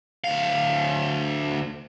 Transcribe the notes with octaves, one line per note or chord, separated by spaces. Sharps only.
D2 F5